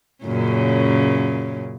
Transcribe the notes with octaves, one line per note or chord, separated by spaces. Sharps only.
F#2 A#2 C#3